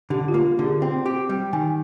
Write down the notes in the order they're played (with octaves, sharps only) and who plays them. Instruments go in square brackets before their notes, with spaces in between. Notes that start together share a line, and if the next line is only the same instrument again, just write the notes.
[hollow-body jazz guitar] D3 [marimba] G4
[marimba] F4
[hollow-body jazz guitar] A#3
[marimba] G4
[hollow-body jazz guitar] D3
[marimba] G#4
[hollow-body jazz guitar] C4 [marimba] G5
[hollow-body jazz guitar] G4
G3
[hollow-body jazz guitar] D#3 [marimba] G#5